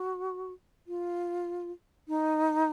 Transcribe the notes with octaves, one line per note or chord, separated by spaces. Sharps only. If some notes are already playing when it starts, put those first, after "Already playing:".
Already playing: F#4
F4
D#4